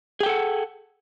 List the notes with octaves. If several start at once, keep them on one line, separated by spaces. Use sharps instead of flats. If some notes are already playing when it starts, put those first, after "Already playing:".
G#4 A4 F#5 G5